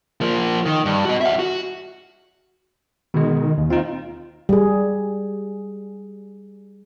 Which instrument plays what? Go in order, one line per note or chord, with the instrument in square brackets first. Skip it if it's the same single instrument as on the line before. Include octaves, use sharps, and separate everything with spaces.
[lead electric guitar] F3 A#3
D#3
G2
F#4 D#5
E5 F#5
F#4
[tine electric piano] B2 G#3 [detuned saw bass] D#3
[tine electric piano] D#2
[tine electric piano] C4 D#4 [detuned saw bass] F4
[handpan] G3 G#4